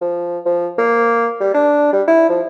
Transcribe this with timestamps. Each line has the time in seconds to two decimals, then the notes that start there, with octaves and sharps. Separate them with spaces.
0.01 F3
0.45 F3
0.78 A#3
1.40 G3
1.54 D4
1.93 G3
2.08 E4
2.29 F3